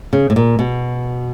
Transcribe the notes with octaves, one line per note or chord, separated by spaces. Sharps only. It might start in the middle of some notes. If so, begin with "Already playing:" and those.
C#3
A2
A#2
B2